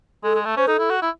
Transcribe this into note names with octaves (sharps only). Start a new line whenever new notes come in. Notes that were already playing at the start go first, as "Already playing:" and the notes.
G#3 A4
G#3
A3
C#4 C5
D#4 A4
E4
F#4
E4